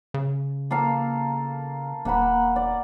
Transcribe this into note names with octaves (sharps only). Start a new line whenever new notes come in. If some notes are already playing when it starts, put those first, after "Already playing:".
C#3
A#3 A4 F5
D#1 A#3 F#5 B5
D5